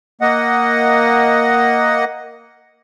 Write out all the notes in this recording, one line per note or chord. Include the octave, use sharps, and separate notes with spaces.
A#3 D#5 F#5